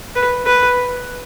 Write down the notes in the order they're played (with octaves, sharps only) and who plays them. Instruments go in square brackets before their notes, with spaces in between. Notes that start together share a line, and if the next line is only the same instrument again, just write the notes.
[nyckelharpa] B4
B4